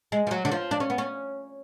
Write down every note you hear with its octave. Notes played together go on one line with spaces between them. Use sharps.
G#3
F3
F#3
D3
F3
D4
C#4
B3
C#4